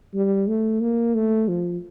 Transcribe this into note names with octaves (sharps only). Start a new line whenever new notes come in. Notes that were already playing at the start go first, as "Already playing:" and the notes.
G3
A3
A#3
A3
F3